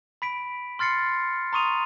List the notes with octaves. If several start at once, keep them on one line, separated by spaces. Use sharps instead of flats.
B5 B6 D7
C6 F6 A6 C7 C#7
A#5 C6 C#6 D#6 D#7 F7